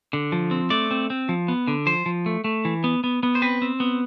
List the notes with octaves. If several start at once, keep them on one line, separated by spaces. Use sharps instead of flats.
D3
F3
C4
A3 D5
C4
C4
F3
B3
D3
F3 C5
F3
A3
A3
E3
B3
B3
B3
C5
C4 B4
C4
B3